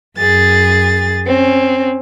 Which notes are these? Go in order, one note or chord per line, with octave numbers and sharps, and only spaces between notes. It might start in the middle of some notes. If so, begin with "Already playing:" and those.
F#2 G#4 A6
C4 C#4